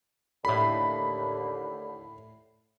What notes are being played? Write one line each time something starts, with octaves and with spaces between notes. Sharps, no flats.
D#2 A2 D3 B5 C7